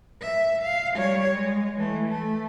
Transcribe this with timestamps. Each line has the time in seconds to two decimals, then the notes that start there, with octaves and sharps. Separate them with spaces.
0.22 E5
0.62 F5
0.95 G3 C#5
1.34 G#3
1.77 E3 A3
2.08 A3